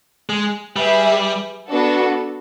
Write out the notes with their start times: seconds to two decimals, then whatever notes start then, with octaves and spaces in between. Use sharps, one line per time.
0.29 G#3
0.76 G3 G#4 B4 E5
1.69 B3 D4 F#4 A4